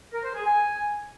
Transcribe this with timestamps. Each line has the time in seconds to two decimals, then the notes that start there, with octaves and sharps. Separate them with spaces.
0.12 A#4
0.23 C5
0.34 G#4
0.45 G#5